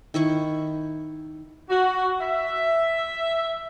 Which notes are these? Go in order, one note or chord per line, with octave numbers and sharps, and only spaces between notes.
D#3 E4 C#6
F#4
E5